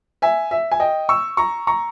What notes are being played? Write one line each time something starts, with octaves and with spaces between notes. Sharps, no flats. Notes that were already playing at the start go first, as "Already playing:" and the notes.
E5 G#5
E5
G#5
D#5 G5
C#6 E6
A#5 C#6
A#5 C#6